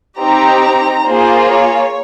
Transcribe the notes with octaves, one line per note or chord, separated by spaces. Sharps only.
C4 D#4 G4 A#5
A#3 F4 G#4 C5
C#5